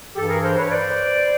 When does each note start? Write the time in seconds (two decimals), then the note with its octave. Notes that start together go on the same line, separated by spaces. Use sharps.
0.15 G2 E3 G4 A4
0.28 G#4 A#4
0.43 A#4 C5
0.57 B4 C#5
0.70 C5 D5